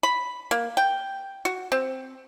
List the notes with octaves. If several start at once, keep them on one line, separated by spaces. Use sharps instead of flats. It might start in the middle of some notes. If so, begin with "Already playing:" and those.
B5
A#3
G5
F#4
C4